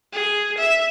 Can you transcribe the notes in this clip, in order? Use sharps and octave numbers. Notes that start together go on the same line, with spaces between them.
G#4
E5